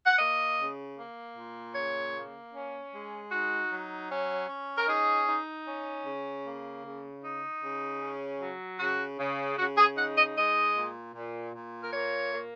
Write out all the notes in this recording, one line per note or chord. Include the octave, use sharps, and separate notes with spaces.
F#5
A#3 D#5
C#3
A#3
A#2
C#3 C#5
A#3
C#4
G#3
D#4 F#4
F#3
C#4
C#4
A#4
D#4 G#4
D#4
C#4
C#3
A#3
C#3
D#4
C#3
C#4
F#3
C#3 F#4
C#3
C#3 F#4
G#4
D#4 F#5
D#5
G#3 D#5
A#2
A#2
A#2
A#4
A#3 C#5
A#3